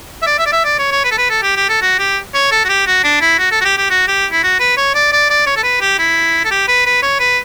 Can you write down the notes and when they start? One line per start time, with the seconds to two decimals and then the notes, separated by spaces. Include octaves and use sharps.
0.22 E5
0.27 D5
0.39 E5
0.46 D5
0.52 E5
0.65 D5
0.79 C#5
0.92 C#5
1.04 B4
1.11 A4
1.18 B4
1.30 A4
1.43 G4
1.56 G4
1.69 A4
1.82 F#4
2.00 G4
2.34 C#5
2.52 A4
2.65 F#4
2.69 G4
2.87 F#4
3.04 D4
3.21 E4
3.39 F#4
3.52 A4
3.61 F#4
3.65 G4
3.78 G4
3.91 F#4
4.08 G4
4.32 E4
4.43 F#4
4.60 B4
4.77 C#5
4.95 D5
5.12 D5
5.30 D5
5.47 C#5
5.57 A4
5.63 B4
5.81 G4
5.99 E4
6.45 A4
6.51 G4
6.68 B4
6.86 B4
7.02 C#5
7.20 B4